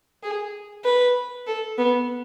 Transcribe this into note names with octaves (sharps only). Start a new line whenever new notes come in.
G#4
B4
A4
B3